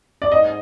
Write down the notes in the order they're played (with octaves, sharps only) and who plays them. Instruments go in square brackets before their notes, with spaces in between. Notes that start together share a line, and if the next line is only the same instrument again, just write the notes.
[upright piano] D5
[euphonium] G#2 [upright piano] D#5